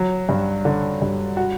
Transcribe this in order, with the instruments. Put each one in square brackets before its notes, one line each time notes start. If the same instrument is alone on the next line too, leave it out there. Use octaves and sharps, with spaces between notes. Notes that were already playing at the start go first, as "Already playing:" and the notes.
Already playing: [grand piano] F#3
G2
D3
G2
F#4